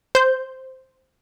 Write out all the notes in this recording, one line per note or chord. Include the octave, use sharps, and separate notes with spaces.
C5 G6